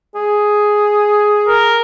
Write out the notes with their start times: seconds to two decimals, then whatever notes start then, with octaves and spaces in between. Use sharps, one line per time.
0.15 G#4
1.48 A#4